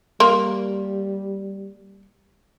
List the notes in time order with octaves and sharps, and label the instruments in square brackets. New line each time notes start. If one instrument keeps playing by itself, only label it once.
[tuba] G3 [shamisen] A#3 [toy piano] C6